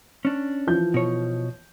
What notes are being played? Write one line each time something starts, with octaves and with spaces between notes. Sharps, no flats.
C#4 D4
E3 F3 G6
B2 C#5